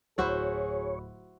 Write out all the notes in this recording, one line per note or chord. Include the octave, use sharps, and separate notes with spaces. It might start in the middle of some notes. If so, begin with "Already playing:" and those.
D1 E4 F#4 G#4 C5 C#5 B5